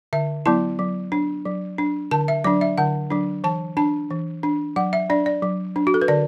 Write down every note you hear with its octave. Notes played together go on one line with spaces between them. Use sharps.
D3 E5
F#3 B3 E4 A5
F#3
D4
F#3
D4
D3 A5
E5
F#3 D4 D5
E5
D3 F#5
F#3 D4
E3 A5
D4 A5
E3
D4
F#3 F#5
E5
D4 D5
D5
F#3
D4
F#4
A4
B4
D3 D5